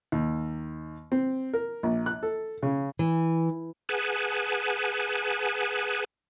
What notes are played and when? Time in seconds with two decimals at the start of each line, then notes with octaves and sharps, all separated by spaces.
0.12 D#2
1.12 C4
1.53 A#4
1.83 A#1
2.06 F#6
2.23 A4
2.63 C#3
2.99 E3
3.89 G#4 B4 F#5 G#5 A5